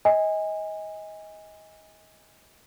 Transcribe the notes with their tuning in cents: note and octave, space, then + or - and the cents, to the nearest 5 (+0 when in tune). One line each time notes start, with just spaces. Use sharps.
D#5 +30 G#5 -20